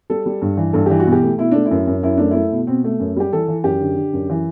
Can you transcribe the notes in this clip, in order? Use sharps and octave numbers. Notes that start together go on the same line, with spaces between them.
G3 A4
G3
G2
E3
G2 A4
E3 G4
F#4
B2
G4
A3
B2 E4
A3 D4
E4
F#2
F#2
F#2 E4
A3 D4
A3 E4
B2
B2 C4
A3
F#2
G3 G4
E3 A4
E3
F#2 G4
D3
D3
F#2
E3